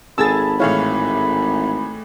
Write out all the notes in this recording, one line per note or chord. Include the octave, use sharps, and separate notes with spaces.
G#1 G#4 A4 A5 B5 E6 G#6 A6
A2 E3 G#3 E4 C#5 F5